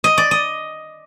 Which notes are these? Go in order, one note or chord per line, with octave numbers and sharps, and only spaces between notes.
D#5
D5
D#5